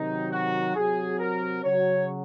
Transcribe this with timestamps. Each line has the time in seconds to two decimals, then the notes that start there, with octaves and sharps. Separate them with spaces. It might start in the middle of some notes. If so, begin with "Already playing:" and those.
Already playing: C3 D#3 F#3 D#4
0.31 F#4
0.75 C3 F#3 G#4
1.19 A#4
1.64 C#3 F#3 C#5